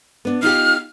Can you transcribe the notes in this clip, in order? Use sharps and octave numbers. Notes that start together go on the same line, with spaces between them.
B3 D4
D#4 F4 G4 F6